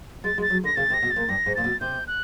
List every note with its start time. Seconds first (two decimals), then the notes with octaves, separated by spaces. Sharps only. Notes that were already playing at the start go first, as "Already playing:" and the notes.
0.24 G#3 A6
0.38 G#3
0.42 A6
0.50 F#3
0.64 D3 A#6
0.76 C#3 A6
0.90 C3
0.94 A#6
1.02 B2
1.11 A6
1.16 A#2
1.28 G2 A#6
1.46 G#2
1.55 A#2 A6
1.64 B2
1.81 C3 G6
2.07 F#6